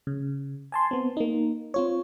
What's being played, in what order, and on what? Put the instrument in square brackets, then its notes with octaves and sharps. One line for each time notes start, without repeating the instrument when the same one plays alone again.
[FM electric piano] C#3
G#5 A5 C6
B3 C4
A#3 D#4
C4 F4 C#5